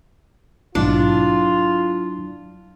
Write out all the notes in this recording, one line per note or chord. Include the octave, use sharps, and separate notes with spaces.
A#1 G#2 B2 F#3 D4 E4 F4